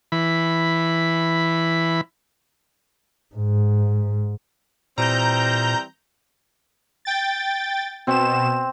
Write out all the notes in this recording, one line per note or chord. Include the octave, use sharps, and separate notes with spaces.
E3 B5
G#2
A#2 E3 G3 C4 A#5 G6
G5 A6
B2 C4 E7